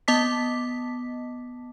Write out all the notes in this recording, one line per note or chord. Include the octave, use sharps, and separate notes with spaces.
B3 D#5 A5 D6 B6